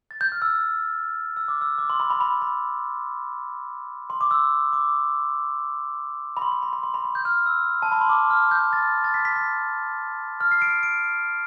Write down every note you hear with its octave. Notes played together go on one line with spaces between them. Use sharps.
A6
G6
F6
E6
E6
D6
E6
D6
C6
B5
B5
B5
B5
C6
D6
E6
D6
B5
C6
C6
B5
B5
C6
B5
B5
G6
F6
E6
A5
B5
C6
D6
F6
G6
A6
A6
B6
B6
A6
F6
C7
D7
D7